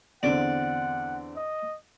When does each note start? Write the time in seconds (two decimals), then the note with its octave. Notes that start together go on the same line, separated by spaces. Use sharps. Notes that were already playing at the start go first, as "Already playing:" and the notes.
0.23 E2 D3 C4 D5 F#5
1.36 D#5